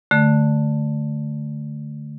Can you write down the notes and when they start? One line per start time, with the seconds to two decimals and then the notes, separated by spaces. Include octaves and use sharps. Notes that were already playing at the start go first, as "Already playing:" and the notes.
0.11 D3 A3